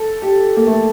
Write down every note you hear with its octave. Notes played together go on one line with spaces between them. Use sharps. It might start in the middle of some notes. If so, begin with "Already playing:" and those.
Already playing: A4
G4
A#3
A3